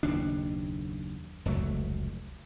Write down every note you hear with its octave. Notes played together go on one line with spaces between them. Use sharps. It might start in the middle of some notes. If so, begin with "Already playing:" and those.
F#1 D#2 B2 D4
F1 C#2 F#3 A3